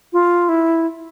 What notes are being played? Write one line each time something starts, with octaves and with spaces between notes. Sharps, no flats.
F4
E4